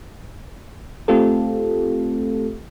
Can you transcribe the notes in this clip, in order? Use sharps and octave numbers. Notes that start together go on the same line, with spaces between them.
A3 C4 F4 G4 A4